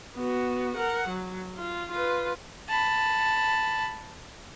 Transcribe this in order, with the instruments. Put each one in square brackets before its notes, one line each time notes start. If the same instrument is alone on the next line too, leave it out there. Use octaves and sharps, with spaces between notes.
[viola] B3 F#4
A#4 F#5
F#3
F4
F4 B4
[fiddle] A5 B5